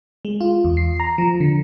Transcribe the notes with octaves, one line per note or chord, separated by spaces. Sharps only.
G#3
F4
E2
C7
A#5
F3
D3